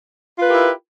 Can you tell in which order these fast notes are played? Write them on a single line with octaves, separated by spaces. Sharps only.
F4 B4 A#4 G4 E4